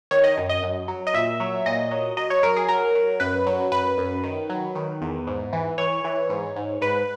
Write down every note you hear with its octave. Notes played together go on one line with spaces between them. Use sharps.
D#3 C#5
D#5
F#2
D#5
F#2
F#3
D#5
A#2 E5
F#3
A#2 D#5
F#3
F#3 D#5
C#5
F#3 A#4
G#4
F#3 A#4
F#3
F#2 B4
F#3
F#2 B4
F#2
D#3
F#3
D#3
E2
G#2
E3
E3 C#5
E3
G#2
G#2
G#2 B4